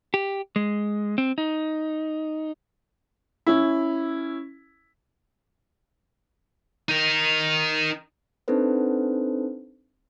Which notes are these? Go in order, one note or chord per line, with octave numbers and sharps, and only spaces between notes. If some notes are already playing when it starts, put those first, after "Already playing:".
G4
G#3
C4
D#4
C#4 E4
D#4 A#4
C4 D4 D#4 A4 B4 C5